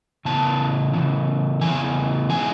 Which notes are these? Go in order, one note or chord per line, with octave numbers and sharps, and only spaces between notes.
C#3 E3 B3 E4 A5
C#3 E3 B3 E4
C#3 E3 B3 E4 G#5
E3 G#3 D#4 G#5